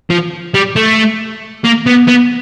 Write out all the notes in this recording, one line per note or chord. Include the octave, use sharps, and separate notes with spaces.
F3
G3
A3
A#3
B3
B3